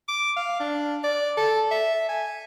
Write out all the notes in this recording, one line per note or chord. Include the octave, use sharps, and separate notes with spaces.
D6
F5
D4
D5
A4
E5
G#5